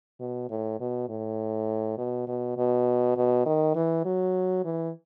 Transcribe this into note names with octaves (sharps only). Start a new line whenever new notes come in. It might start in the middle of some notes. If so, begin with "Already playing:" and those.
B2
A2
B2
A2
B2
B2
B2
B2
D#3
E3
F#3
E3